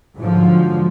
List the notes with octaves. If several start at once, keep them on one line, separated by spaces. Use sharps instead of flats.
G#2 D3 F3 F#3